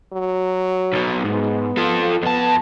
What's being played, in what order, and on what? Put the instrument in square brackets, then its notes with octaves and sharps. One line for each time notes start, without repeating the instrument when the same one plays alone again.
[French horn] F#3
[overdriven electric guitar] B1 B2
[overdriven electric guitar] G#2 [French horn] B3
[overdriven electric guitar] F3 A4
[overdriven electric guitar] F2 A5 [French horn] B3